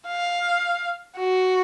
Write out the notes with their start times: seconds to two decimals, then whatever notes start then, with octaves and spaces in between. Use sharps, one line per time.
0.08 F5
1.18 F#4